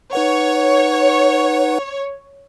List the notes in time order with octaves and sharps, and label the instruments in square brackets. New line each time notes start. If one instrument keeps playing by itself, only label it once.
[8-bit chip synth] D#4 B4 F#5 [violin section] C#5